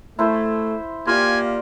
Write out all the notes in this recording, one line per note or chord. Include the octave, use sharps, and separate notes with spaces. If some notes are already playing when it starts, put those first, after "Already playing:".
A3 E4 C5
A#3 F4 G4 D5 G#5